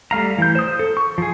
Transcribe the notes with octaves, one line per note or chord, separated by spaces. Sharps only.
G3 A3 F5 A#5
E3 G6
C5 D#6
A4
C#6
F3 G#4